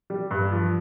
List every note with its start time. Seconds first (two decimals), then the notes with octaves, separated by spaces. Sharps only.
0.10 G3
0.31 G2
0.52 F3